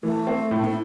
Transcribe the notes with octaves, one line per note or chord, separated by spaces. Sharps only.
E3 A3
C4
A2
E4